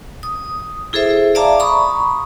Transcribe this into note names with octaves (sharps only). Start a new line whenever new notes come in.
D#6
E4 G#4 A4 C5 E5
D5 E5 F5 A5 A#5 D6
A#5 B5 C#6 D#6